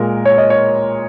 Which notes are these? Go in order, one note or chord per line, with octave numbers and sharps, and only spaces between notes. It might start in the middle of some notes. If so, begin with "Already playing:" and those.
Already playing: A#2 G#3 A#4
C#5
D#5
C#5